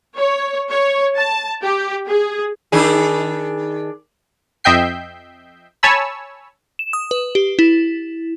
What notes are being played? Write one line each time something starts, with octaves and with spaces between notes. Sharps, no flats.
C#5
C#5
A5
G4
G#4
D#3 D4 G#4
F2 D#5 E5 G5 G6 C7
C#5 G#5 A5 B5 E6
E7
D#6
B4
G4
E4